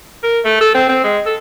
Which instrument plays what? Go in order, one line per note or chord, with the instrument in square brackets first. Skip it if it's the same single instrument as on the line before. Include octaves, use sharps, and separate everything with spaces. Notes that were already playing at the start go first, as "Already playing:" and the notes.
[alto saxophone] A#4
A3
A4
C4
C4
G#3
A4